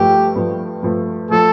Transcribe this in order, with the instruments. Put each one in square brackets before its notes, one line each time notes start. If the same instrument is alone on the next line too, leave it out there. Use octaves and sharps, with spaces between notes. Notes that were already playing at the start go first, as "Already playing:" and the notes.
Already playing: [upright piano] G2 F3 A3 [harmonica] G4
[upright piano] G2 F3 A3
G2 F3 A3
[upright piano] F3 A3 [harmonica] A4